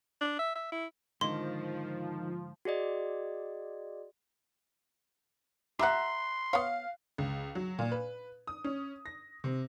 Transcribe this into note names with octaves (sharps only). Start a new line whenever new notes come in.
D4
E5
E5
E4
G#2 D3 D#3 F3 C6
F#4 G#4 D5 D#5
G4 E5 F#5 A#5 C6 F#6
B3 C#5 F5
C#2
F#3
A#2
B4
D#6
C#4
A#6
C3